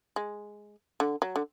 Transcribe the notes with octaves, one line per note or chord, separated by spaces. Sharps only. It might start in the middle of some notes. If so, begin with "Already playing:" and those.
G#3
D3
F#3
D3